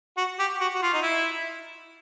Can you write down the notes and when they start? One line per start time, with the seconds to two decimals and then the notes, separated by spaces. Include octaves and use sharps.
0.17 F#4
0.39 G4
0.61 F#4
0.75 F#4
0.82 F4
0.94 D#4
1.02 E4